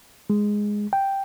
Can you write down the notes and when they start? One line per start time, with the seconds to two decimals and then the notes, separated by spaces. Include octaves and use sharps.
0.30 G#3
0.93 G5